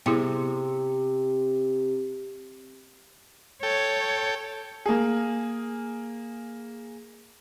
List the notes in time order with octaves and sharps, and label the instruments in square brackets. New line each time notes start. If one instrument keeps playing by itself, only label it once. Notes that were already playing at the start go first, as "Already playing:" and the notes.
[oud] C3 [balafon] B3 E4 G#4
[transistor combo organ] A4 G5 [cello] C#5
[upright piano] A#3 G#4